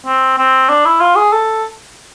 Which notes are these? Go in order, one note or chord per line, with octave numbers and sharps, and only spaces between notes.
C4
C4
D4
E4
F4
G#4
A4